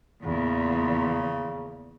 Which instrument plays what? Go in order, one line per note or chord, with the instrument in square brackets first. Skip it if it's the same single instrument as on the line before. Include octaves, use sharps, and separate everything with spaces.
[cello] E2 A#2 [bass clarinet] C#3